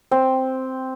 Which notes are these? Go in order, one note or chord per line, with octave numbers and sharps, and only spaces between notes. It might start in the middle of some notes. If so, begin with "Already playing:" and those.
C4